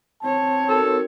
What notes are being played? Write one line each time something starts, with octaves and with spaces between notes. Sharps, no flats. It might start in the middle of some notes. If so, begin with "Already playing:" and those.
C4 C#5 A5
D#4 F#4 A4 A#4